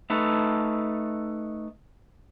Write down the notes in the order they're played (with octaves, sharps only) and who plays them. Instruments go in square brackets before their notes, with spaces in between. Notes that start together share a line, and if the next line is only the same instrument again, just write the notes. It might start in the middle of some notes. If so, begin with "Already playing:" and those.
[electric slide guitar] A3 D#4 A4 B4